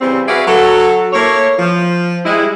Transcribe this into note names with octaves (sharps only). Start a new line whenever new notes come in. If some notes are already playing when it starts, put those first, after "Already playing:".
C#3 E3 G3 C4
F#4 G#4 B4 D5 E5 F5
F#3 A4
A3 A#3 E4 C#5
F3
G3 G#3 E4